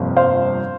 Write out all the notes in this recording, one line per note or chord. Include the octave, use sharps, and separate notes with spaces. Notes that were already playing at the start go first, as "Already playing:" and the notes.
Already playing: G1 F2 C3 A#3
C5 F5